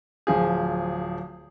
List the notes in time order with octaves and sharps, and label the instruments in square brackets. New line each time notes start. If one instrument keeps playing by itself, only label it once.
[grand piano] D1 F3 G#4